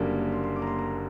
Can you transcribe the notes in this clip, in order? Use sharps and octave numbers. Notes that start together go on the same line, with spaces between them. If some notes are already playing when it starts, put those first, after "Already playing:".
Already playing: F#1 F#2 D3 G3 A#3
C6
C6
D6
A#5
C6
A#5